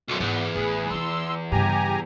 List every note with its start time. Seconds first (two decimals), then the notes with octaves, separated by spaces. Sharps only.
0.09 B1 F#2
0.20 E2 G#2 E3 B3
0.55 A1 G#4 B4
0.91 E3 F4 C6 E6
1.52 G2 C#3 G4 G#5 A#5